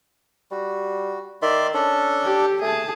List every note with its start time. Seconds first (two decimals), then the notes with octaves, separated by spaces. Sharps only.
0.51 G3 F#4
1.42 D#3 D5 E5 C6
1.74 C#4 D4 A4
2.24 G4
2.62 A3 G#4 A5